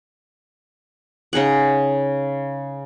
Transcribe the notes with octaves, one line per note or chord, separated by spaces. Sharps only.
C#3 D#4 G#4 F#5